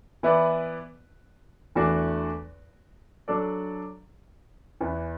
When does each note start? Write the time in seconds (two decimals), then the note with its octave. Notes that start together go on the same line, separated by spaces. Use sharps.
0.23 E3 B3 E4 B4 D5
1.75 E2 E3 A3 D4 F#4
3.28 F#3 D4 A4 D5
4.81 E2 E3 B3